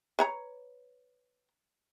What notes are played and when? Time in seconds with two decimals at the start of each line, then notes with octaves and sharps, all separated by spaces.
0.19 B4 C#5 A#5